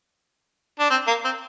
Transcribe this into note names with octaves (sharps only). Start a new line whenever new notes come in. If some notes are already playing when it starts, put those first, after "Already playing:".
D4
C4
A#3
C4